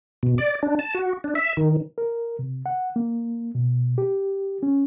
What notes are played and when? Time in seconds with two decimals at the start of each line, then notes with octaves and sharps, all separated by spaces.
0.23 B2
0.38 D5
0.63 D4
0.79 A5
0.94 F#4
1.24 D4
1.35 E5
1.57 D#3
1.98 A#4
2.39 C3
2.66 F#5
2.96 A#3
3.55 B2
3.98 G4
4.63 C#4